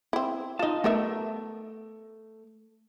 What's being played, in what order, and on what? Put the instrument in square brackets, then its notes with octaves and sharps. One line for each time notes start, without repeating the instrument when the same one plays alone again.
[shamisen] C4 E4
[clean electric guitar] D#4 A5 [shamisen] F4 D#5
[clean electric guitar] A3 [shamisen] B3 A#4 E5